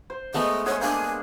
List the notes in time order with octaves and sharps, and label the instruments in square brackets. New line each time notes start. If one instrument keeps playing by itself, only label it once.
[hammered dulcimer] C5
[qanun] G#3 A3 B3 [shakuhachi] D#5
[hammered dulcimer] G#4 C5 F#5 [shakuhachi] C#5
[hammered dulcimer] A#3 D4 [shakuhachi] G#5